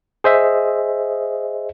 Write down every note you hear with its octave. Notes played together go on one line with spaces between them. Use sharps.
G#4 C5 D#5 E5